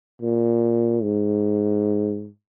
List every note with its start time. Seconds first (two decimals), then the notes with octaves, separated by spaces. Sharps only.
0.22 A#2
1.03 G#2